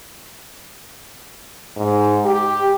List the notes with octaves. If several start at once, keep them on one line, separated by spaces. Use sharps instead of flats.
G#2
G4